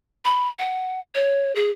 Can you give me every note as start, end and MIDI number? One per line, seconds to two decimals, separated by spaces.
0.25 0.48 83
0.59 0.99 78
1.15 1.54 73
1.55 1.70 68